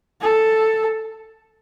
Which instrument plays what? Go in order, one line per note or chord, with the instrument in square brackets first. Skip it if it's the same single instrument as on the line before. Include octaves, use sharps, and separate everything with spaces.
[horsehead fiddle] A4